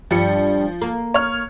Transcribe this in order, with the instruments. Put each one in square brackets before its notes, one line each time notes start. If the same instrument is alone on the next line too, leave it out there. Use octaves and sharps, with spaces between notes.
[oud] G2 G3 [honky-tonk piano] F3 C#7
[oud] A#3
[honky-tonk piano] C#5 F6